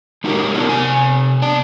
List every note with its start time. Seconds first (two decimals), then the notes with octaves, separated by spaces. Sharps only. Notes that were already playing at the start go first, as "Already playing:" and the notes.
0.24 G#3 D#4 F#4 G4 A#4
0.54 B3 D4 F4 A#4
0.69 C3 G#5
1.42 B3 D4 D5 A5